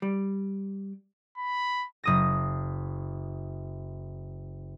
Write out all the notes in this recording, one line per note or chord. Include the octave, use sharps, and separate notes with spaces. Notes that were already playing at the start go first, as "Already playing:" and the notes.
G3
B5
F#1 D#6 A#6